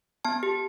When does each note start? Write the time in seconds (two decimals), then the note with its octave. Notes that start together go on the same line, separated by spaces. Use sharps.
0.25 B3 A5
0.43 G4